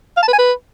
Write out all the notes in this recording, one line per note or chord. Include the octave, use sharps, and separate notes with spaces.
F5
A5
B4
G#5
B4